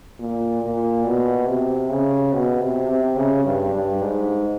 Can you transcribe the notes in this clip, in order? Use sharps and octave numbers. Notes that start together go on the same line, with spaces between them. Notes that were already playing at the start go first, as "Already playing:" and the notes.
A#2
A#2
B2
C3
C#3
B2
C3
C3
C#3
G2
G2
G#2